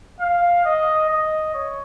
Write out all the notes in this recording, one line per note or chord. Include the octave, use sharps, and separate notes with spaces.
F5
D#5
D#5
C#5